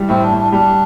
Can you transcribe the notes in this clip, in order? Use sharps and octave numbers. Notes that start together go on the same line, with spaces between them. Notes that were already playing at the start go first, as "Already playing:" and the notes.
Already playing: G2 E3 G3
A2 C4
D4
A2
D4
G3 D4